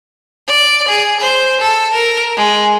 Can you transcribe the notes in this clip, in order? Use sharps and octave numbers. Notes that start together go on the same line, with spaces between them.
D5
G#4
C5
A4
A#4
G#3